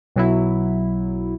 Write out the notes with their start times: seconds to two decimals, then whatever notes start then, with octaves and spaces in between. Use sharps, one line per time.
0.16 B1 F#3 E4